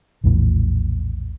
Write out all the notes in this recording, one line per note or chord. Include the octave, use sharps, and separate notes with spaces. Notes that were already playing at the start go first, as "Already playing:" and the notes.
A#1 E2 A2 E3